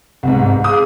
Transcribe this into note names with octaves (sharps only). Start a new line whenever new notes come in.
C2 G#2
G#4 F5 D6 D#6